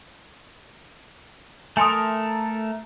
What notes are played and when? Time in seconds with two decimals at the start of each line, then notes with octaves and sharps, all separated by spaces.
1.77 A3 A4 A#4 G#5 C6 D#6